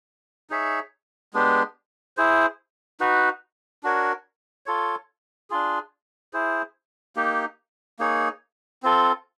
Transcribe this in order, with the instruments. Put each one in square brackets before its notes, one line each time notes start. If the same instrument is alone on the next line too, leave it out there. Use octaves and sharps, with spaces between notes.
[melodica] D#4 G#4 C#5 E5
G#3 B3 D4 G4
E4 G#4 C5
D#4 F#4 B4
D4 F#4 A#4 C#5
F4 A4 C#5
D4 F4 G#4
E4 G#4 C5
A#3 D#4 G4
A#3 D#4 G#4 C#5
C4 F4 A4